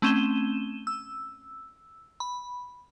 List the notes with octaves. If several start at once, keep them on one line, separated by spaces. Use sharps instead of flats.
A3 C4 C#4 D#7 E7 G7
E6
B5